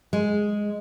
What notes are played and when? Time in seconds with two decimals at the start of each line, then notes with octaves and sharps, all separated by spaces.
0.13 G#3